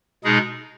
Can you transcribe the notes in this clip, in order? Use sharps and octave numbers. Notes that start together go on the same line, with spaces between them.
B2 G#3 D#4 G#4